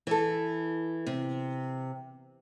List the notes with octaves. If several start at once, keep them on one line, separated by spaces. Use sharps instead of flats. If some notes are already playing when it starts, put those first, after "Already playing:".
E3 A4
C3